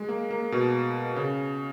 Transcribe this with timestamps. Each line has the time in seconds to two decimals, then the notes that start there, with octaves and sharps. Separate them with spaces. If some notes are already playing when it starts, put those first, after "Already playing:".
Already playing: G#3
0.09 A#3
0.31 A#3
0.52 B2
1.16 C#3